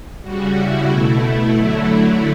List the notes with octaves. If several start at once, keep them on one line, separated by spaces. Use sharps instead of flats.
C#3 G3 F#4
E4
B2 A3
D3 F#3 A3